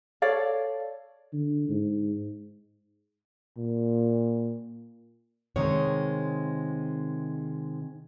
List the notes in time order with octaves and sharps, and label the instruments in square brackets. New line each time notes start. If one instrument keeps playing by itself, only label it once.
[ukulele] A4 C#5 D5 F5
[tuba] D3
G#2
[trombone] A#2
[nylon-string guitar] C3 D#3 G#3 C#5